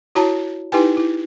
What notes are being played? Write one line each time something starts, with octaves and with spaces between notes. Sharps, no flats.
E4 F#4 C#5 A5 A#5
D#4 E4 G4 B4 G5 G#5
E4